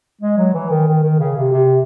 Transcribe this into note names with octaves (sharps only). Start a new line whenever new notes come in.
G#3
F#3
E3
D#3
D#3
D#3
C#3
C3
C3